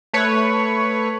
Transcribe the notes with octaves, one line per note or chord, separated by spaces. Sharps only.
A3 B4 C#5